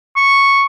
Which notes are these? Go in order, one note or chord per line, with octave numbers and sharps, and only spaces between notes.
C#6